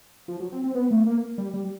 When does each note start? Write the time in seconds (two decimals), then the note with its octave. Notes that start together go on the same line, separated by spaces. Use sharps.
0.28 F3
0.40 F#3
0.52 C4
0.64 C4
0.75 B3
0.91 A3
1.06 A#3
1.38 G3
1.54 G3